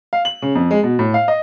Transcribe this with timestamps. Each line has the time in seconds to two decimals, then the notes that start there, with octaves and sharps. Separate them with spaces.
0.13 F5
0.25 F#7
0.42 C#3
0.55 F2
0.71 G#3
0.83 B2
0.99 A2
1.14 F5
1.28 D#5